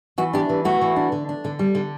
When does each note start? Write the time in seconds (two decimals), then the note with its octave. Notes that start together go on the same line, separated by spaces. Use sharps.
0.18 E3 F#4
0.33 D4 G4
0.49 E3
0.65 A3 F#4
0.81 E3
0.96 D4
1.12 D3
1.29 D4
1.45 D3
1.59 G3
1.75 D3